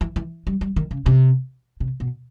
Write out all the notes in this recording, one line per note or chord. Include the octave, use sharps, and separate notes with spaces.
E3
E3
G3
G3
D#3
C#3
C3
C3
B2